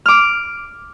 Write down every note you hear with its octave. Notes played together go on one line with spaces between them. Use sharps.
D6 F6